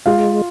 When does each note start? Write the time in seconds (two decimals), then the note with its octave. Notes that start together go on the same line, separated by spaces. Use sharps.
0.06 G#3 F4 F5